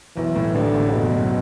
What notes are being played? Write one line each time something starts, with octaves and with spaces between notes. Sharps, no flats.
B1 E3
A2
A1 D3
A2
F#1 B2
F#2